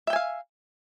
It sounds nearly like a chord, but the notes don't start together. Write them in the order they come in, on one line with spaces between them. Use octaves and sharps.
E5 G5 G#5 F5